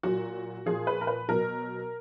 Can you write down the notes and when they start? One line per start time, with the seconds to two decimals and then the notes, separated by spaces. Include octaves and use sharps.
0.03 A#2 F#3 F#4
0.66 A#2 F3 G#4
0.87 B4
1.01 A#4
1.07 B4
1.29 B2 F#3 A#4